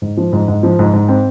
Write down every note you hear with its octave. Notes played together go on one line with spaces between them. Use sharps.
G#2
F3
G#2
G#2
F3
G#2
G#2
C4